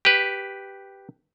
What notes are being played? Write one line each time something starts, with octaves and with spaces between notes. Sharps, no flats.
G4 B4